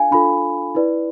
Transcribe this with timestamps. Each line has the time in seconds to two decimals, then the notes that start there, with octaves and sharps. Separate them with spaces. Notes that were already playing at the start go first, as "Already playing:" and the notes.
Already playing: D4 F4 A4 F5 G#5
0.11 D4 F4 A4 B5
0.75 E4 B4 D5